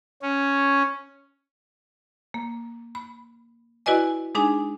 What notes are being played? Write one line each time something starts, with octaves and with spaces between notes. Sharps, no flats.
C#4
A#3
B5
E4 F#4 B4 D5 D#5 G#5
G#3 D4 D#4 G#4 G#5